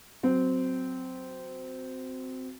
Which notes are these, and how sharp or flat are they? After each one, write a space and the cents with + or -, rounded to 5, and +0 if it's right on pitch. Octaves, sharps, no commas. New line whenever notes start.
F#3 +0 C4 -15